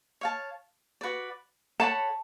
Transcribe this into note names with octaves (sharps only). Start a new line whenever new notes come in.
C#5 F5 A5
F#4 B4 D5
A4 C#5 F#5 A5 B5